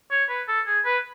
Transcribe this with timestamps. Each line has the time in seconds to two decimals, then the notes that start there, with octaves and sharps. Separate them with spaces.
0.11 C#5
0.29 B4
0.48 A4
0.67 G#4
0.85 B4